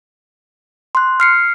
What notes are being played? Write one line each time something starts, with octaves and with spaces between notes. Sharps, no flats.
C6 F#6
F6 C7 C#7